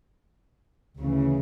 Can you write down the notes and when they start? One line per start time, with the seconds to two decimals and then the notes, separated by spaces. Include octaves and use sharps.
0.98 D2 C#3 E3